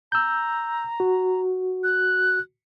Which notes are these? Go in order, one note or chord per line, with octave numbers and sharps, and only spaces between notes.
A#5 E6 G6
F#4
F#6